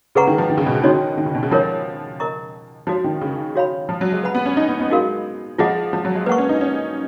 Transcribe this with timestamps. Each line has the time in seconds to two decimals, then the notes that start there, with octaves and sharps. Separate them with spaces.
0.15 C#3 G#4 B4 F#5 A#5 C#6
0.27 D#3
0.38 F3
0.50 D#3
0.57 C#3
0.66 B2
0.75 C#3
0.84 D#3 D#4 F#4 C#5
1.18 D#3
1.26 C#3
1.35 B2
1.43 C#3
1.51 F3 F4 A#4 C#5
2.20 A#4 D#5 A#5 C#6
2.87 F3 D#4 F#4 C#5
3.04 D#3
3.21 C#3
3.56 F#4 C#5 F5 B5
3.89 F3
4.01 F#3
4.12 G#3
4.23 B4 F#5 B5
4.35 B3
4.46 C#4
4.57 D#4
4.69 B3
4.80 B3
4.91 G#3 D#4 F#4 A#4 F5
5.58 F3 F4 G#4 D#5 F#5
5.93 F3
6.05 F#3
6.15 G#3
6.26 A#3 B4
6.29 F#5 C#6
6.38 C#4
6.49 D#4
6.61 C#4